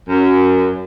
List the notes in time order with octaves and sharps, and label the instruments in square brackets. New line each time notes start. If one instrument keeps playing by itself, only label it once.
[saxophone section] F#2